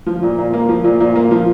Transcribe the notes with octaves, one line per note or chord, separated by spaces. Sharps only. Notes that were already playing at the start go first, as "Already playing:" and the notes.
F3
A#2
A#2
A#3
F3
A#2
A#2
A#3
F3